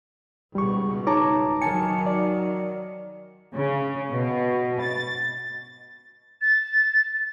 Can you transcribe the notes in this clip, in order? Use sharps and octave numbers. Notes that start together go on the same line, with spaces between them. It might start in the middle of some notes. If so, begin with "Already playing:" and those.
C#2 G#2 B2 G3 C#6
D#4 C#5 A5 A#5 D6
D#3 F#3 G#5 A5 C#7
D5
C#3
B2
A6
A6